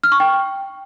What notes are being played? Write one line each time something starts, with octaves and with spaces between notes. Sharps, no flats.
F6
C#6
G5